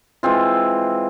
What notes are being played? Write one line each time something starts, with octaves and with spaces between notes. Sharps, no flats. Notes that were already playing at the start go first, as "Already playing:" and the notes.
E3 G#3 C4 F4